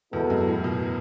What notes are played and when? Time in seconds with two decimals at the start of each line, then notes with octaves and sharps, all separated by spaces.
0.13 E2 B2 G#3 B3 E4 A4
0.30 F#2
0.47 A2
0.64 B2